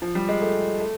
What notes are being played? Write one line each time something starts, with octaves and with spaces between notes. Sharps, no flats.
F3
G3
G#3
A3
A3